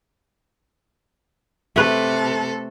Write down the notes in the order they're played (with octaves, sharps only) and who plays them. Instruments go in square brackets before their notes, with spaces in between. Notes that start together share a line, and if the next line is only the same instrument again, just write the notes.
[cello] C3 A4 [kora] A3 B4